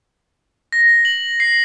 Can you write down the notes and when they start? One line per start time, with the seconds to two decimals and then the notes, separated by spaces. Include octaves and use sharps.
0.72 A#6
1.05 F#7
1.40 C7